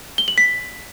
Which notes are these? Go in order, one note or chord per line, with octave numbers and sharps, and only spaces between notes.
G7
F#7
B6